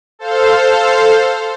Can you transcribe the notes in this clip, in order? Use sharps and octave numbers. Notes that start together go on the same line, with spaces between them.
A4 C5 F5